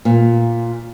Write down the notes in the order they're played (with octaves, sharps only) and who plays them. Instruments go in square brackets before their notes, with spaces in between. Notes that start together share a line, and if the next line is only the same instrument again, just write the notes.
[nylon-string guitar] A#2